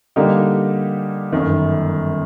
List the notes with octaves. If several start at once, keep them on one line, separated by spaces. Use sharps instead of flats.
D3 G3 A#3 D#4 G4
G1 F#2 D#3